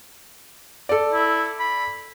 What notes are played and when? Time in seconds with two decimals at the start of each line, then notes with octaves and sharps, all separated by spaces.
0.89 A4 D5
1.13 E4
1.60 B5